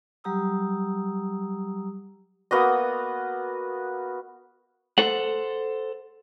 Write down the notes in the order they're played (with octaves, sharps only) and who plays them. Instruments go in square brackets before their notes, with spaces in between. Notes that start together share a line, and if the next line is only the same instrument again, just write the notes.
[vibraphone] F#3 G3 G4 A#5 D#6 E6
[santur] A#3 B3 F#4 D#5
[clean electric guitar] A4 C5 F#5